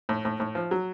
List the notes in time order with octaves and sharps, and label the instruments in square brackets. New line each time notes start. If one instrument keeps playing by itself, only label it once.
[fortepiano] A2
A2
A2
F3
F#3